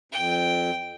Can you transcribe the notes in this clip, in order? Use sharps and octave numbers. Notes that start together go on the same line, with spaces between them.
F2 G5